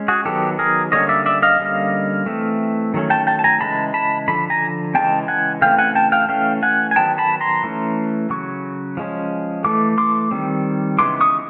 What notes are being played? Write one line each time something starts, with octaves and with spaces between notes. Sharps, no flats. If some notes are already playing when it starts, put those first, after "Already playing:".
Already playing: G#3 C#4
F#4 G#4
D#3 F#3 B3 G4 A4
G#4 A#4
D3 G3 A#3 C#4 C#5 D#5
D5 E5
D5 E5
D#5 F5
D3 G3 A#3 C#4
E3 A3 C4
D#3 F#3 A3 C#4
G5 A5
G5 A5
A5
G#5 A#5
C#3 E3 G#3 A5 B5
A5 B5
D3 F3 B5
G#5 A#5
C#3 E3 G#3 C4 G5 A5
F#5 G#5
C#3 E3 A3 C4 F5 G5
F#5 G#5
G5 A5
F5 G5
E3 A3 C#4 F5 G5
F#5 G#5
G#5
D#3 F#3 B3 G5 A5
A5 B5
A#5 C6
E3 A3 C#4
C#3 F#3 C#6
F3 G#3 C#4
E3 A3 D6
C6 D6
D#3 G3 C4
C#3 E3 G#3 B3 C6 D6
C#6 D#6